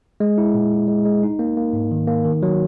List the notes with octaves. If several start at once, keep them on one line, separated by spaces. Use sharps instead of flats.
G#3
E4
A#2
A#2
G#3
G#3
D#4
A#3
A#3
G#2
D#3
A#3
D#3
F#3